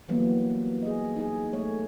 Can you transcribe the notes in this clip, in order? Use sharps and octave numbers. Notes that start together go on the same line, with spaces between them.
E3 F#3 G3 A#3 B3
G#4 D#5
D#4 G#4
A3 C#5